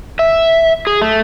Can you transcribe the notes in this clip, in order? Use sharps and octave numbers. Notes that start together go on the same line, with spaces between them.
E5
G#4
A3